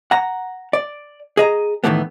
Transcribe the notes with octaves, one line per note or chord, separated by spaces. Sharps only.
F#5 A#5
D5
G#4 D#5 A#5
A2 D#3 E3 A3 B3